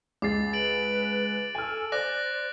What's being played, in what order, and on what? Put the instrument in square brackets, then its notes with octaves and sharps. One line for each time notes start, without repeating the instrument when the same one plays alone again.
[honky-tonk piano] C#2 C7 [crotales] D6 A6
[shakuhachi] B4 [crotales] A6 D7 F#7
[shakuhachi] A4 [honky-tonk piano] G#5 F6
[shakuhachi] C5 [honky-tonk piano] D5 [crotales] D6 F#6 A#6